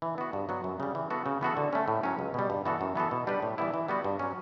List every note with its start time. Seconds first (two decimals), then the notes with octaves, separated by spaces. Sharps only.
0.02 E3
0.18 B3 F#4
0.33 G2
0.49 F#3 B3 F#4
0.64 F#2
0.80 C#3 G3
0.95 E3
1.10 B3 F#4 A4
1.26 C#3
1.41 E3 B3 F#4 A4
1.57 D3
1.73 A3 C#4
1.88 A2
2.03 F#3 C#4
2.19 C#2
2.34 B2 G3
2.50 G2
2.65 E3 B3 F#4 A4
2.81 F#2
2.96 E3 B3 F#4 A4
3.11 B2
3.27 G3 D4 G4 B4
3.42 A2
3.58 E3 G3 B3 E4
3.74 E3
3.88 G3 B3 F#4
4.04 G2
4.19 F#3 C#4